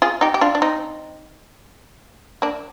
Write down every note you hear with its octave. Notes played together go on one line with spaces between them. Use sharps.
F4 G#4
D#4 G4
G4
D4 F4
D4
C4 D#4
A#3 D4